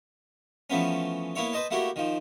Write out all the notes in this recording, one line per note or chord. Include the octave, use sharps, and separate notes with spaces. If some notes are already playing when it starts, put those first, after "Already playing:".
E3 F3 A3 B3 C#4
A#3 B3 E4 C#5
B4 C5 D#5 A5
A3 A#3 E4 F#4 G4
D#3 F3